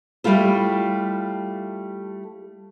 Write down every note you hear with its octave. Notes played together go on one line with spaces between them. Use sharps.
G3 A3 E4 F4 A4